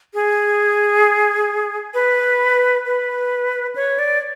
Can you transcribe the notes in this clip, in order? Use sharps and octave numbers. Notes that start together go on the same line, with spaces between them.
G#4
B4
B4
C#5
D5